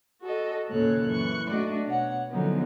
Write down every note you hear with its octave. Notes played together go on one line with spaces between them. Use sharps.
F#4 A4 D#5
D#2 A#2 C#3 A4 C#5 F#6
F#2 E3 C#6 F#6
A3 D4 F#4 D5 D#5
B2 C#5 F#5
D3 F3 F#3 B3 C#4 D#4